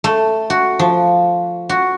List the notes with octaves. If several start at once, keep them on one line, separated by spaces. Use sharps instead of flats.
A3
F#4
F3
F#4